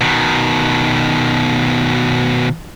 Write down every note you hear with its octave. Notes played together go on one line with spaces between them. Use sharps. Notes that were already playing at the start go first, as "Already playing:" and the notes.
B2 D#3